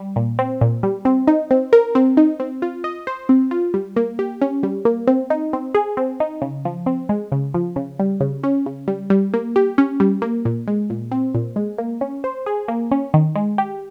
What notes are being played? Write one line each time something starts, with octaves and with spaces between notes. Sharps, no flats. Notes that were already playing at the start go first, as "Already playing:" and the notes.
Already playing: G3
A#2
C4
A#2
G3
C4
D#4
C4
A#4
C4
D#4
C4
F4
D#5
C5
C4
F4
G3
A#3
G4
C#4
G3
A#3
C4
D#4
C4
G#4
C4
D#4
C#3
F3
C4
G#3
C#3
F3
C#3
G3
C#3
C#4
C#3
G3
G3
A#3
G4
C#4
G3
A#3
A#2
G#3
A#2
C4
A#2
G#3
A#3
C#4
C5
G#4
A#3
C#4
D#3
G#3
G4